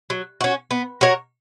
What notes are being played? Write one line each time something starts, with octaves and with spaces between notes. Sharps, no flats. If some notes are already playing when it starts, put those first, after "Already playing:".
F#3
C#4 F#4
B3
F#4 A#4 C#5